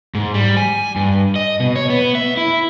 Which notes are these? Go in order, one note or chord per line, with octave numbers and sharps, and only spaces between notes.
G#2
G3
G#5
G2
D#5
B2
C#5
B3
E5
E4